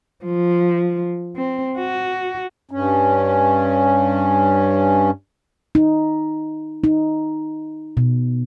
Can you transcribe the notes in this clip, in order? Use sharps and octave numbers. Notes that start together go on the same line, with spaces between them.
F3
C4
F#4
G2 C#4
D#4
D#4
B2